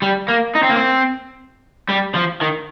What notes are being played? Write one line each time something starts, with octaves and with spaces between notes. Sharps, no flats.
G3
A#3
D#4
C4
A#3
C4
G3
F3
D#3